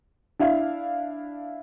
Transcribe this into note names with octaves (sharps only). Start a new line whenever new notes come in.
D4 E4 F5